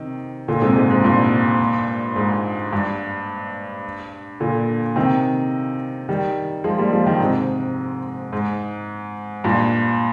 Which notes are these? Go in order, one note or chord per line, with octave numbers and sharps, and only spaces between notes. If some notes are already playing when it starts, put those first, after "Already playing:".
Already playing: C3 D#3
A#2 D3
G#2 C3
G#2
G#2
G2 A#2
G#2
G2
A#2 D3
C3 D#3
D#3 G3
F3 G#3
G3 A#3
F3 G#3
D#3 G3
G#2 C3
G#2
G2 A#2